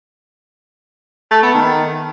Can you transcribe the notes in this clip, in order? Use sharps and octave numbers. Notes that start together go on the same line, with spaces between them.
A3
B3
D#3